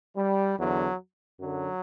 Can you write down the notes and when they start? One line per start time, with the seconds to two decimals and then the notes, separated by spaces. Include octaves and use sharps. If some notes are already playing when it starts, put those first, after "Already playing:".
0.17 G3
0.58 E2 D3 F#3
1.39 F#2 D3 F#3